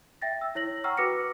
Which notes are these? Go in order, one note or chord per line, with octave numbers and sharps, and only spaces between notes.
E5 G5 A6 A#6
E6
E4 C#5 A#6 F#7
F#5 G5 A#5 C#6 E6 F6
F#4 B4 D6 A#6 C#7